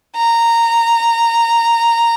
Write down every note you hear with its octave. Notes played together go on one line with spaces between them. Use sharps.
A#5